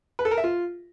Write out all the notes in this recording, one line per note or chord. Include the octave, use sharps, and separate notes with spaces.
B4
A4
A#4
E5
F4